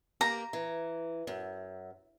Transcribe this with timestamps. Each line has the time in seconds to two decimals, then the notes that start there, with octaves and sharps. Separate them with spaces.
0.21 A#3 G4 A#5
0.53 E3
1.27 F#2